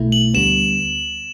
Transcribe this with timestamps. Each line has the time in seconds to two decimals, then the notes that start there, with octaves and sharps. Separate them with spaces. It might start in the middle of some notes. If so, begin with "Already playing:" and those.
Already playing: B1 B2 A3 E4
0.12 F#7
0.34 D2 D3 G3 B3 E7